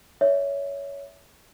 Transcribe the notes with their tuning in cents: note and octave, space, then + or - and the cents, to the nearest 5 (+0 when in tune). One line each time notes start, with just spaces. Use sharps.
C#5 +20 E5 -5